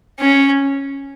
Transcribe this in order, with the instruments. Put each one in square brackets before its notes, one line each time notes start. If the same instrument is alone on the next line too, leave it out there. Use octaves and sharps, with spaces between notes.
[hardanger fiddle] C#4